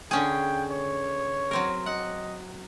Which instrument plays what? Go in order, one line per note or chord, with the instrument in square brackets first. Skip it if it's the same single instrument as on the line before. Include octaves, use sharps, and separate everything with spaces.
[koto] D3 C#4 G#4 [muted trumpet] G5
[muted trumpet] C#5
[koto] F#3 C4 A#4
[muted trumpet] D#5 [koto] F#5